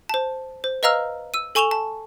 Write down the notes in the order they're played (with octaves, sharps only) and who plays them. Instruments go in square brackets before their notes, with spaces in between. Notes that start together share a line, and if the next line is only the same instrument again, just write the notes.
[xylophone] C5 A5
C5
B4 D#5 F5 A#5 E6 F6
E6 D#7
A4 G#5 C#6 E7 F7 G7
A5